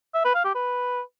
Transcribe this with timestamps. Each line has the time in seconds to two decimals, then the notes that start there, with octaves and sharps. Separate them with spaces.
0.14 E5
0.24 B4
0.35 F5
0.45 G4
0.55 B4